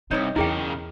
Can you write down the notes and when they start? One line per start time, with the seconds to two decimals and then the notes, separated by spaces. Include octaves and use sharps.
0.11 C2 C4 D#4 E4 C#5 D#5
0.36 E2 C#3 E3 E4 G#4 A#4 G5